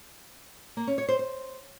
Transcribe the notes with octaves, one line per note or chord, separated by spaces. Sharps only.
A#3
C#4
C#5
C5
C5